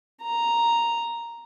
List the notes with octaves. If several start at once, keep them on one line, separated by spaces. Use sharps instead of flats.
A#5